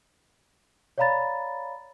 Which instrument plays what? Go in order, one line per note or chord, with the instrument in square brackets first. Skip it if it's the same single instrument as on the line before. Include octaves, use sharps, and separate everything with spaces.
[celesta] C#5 D5 F5 A#5 B5 A6